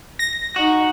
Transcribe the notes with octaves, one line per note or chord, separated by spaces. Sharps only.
A#6
D#4 F#4